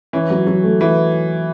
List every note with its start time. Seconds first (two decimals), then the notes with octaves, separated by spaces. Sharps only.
0.13 E3 C#4
0.30 F#3
0.47 F#3
0.64 A3
0.81 E3 F#3